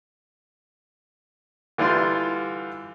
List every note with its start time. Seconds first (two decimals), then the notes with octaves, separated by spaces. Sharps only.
1.78 D3 E3 G3 F4 C6